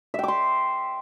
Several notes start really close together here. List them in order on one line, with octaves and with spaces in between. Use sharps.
E5 G5 D6 C6